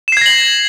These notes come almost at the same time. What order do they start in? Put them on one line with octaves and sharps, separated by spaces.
E7 C7 G#6 A#6 F#7